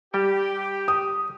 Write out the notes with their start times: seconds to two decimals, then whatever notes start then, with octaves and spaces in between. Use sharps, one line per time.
0.14 G3 G4 G5
0.88 D#6